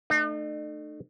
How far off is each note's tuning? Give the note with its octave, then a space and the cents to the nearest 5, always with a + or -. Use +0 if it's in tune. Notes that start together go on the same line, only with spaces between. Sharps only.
A3 +0 D#4 -45